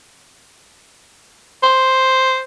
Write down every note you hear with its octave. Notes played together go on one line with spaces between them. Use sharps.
C5